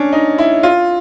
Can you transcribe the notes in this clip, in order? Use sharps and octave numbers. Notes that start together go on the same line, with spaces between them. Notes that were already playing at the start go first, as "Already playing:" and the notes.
Already playing: C#4 D4
D#4
E4
F4